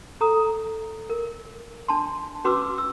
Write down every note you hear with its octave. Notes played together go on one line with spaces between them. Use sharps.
A4 A#5 D#6
A#4
D4 A5 C6
C#4 F#4 B4 C6 D6 E6
E6